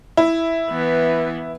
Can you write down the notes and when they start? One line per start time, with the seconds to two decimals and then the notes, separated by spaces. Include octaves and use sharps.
0.17 E4
0.70 E3 B3